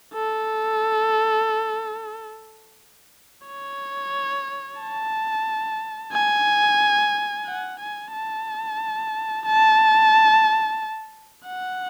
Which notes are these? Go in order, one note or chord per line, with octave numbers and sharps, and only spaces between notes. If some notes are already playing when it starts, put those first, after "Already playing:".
A4
C#5
A5
G#5
F#5
G#5
A5
A5
F#5